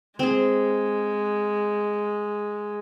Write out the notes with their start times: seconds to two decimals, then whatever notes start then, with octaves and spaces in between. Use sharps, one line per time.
0.19 G#3 C4 G#4